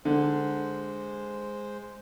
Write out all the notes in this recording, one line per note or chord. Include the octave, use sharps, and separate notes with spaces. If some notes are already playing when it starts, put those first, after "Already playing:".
D3 G#3 C5